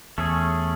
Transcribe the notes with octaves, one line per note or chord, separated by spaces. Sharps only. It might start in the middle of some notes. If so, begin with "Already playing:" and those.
E2 A3 C#4 G#4